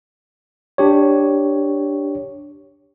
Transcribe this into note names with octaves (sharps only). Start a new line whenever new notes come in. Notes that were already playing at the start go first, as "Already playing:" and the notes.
D4 G4 C#5